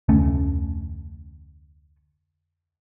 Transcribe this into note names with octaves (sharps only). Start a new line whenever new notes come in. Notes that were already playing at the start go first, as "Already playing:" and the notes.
F1 D2 A3 C#4